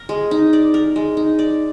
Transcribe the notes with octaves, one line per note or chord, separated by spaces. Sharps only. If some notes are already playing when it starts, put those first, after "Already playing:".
Already playing: A#4
G#3
D#4
D5
A#4
G#3
D#4
D5